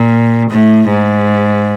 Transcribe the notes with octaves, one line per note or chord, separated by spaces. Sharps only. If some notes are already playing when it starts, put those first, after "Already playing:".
Already playing: A#2
A2
G#2